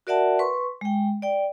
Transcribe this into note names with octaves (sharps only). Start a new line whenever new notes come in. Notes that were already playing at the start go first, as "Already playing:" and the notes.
F#4 A#4 D5 E5 F#5 A5
B4 C6 C#6
G#3 G5
D5 G5